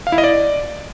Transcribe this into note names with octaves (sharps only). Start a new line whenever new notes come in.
F5
E4
D#5
D5